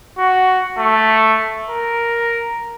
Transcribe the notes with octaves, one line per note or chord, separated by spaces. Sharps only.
F#4
A3
A#4